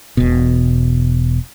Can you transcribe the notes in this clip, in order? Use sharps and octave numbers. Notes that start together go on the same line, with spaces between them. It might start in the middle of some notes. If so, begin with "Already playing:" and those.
E1 B2